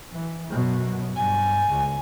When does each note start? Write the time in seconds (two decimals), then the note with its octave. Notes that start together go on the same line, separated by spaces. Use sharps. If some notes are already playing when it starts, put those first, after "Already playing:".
0.11 E3
0.52 F#2 B2 F#3
1.16 G2 G#5
1.69 C#2